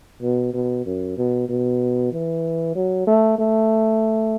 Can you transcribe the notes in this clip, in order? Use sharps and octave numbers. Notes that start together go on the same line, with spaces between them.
B2
B2
F#2
B2
B2
E3
F#3
A3
A3